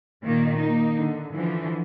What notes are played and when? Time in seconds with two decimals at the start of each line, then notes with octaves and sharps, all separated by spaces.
0.24 A#2 D#3 A#3
0.60 A#3 D#4
0.94 D3
1.32 D3 E3 F3